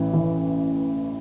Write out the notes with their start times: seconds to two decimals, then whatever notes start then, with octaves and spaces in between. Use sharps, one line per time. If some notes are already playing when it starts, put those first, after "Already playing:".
Already playing: A1 E3
0.13 E3